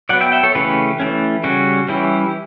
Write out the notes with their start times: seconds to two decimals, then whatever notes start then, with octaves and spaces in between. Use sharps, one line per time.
0.09 F#3 B3 D5 F#5
0.21 E5 G5
0.32 E5 G5
0.43 A4 C#5
0.55 C#3 E3 A3 C#4 G4 B4
1.00 E3 A3 C#4
1.44 C#3 G3 C#4 F#4
1.89 E3 G3 C#4 E4 G4